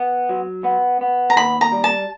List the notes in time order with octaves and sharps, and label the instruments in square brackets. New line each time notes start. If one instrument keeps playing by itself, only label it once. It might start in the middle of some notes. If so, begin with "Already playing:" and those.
Already playing: [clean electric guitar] B3
F#3
B3
B3
[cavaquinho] A#5
[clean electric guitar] D#2 [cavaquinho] B5
[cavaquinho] A#5
[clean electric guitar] G3
[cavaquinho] A5